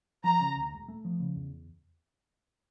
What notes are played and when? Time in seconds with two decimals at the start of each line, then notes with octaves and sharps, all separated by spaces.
0.24 F3 A#5
0.40 C#3
0.56 D2
0.72 E1
0.88 A3
1.05 F3
1.20 C#3
1.36 E2